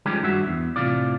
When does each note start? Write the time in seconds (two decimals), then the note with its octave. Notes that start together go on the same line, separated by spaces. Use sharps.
0.06 D#3 F3 G3 G#3 C#4 G4
0.23 G2 F#4 E5
0.47 E2
0.76 A2 C3 F4 D5